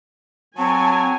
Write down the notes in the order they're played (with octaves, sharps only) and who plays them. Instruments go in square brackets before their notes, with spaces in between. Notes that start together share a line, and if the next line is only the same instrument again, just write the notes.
[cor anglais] F#3 [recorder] C4 [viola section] G#5 [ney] A5